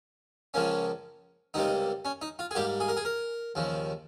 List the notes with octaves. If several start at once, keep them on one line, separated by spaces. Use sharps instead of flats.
C#2 C#3 F3 A#3 C#4
C#2 C3 G3 A#3 D#4
C#4
D#4
F4
G#4
G#2 G3 A#3 G4
G#4
A#4
G#4
A#4
D#2 C#3 F3